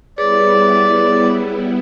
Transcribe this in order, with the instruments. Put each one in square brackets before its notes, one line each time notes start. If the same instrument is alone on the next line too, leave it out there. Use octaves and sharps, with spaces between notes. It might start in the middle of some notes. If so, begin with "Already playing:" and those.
[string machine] G3 B3 E4 [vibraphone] G#4 B4 C#5 [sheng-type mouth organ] D5